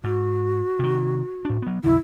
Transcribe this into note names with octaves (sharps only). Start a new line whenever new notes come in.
G#2 F#4
C3 D#3
A2 D4
F#3 B3
B1 F2 D3 E4